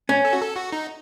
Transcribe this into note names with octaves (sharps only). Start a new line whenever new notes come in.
C#4
A4
F#4
A4
F#4
D#4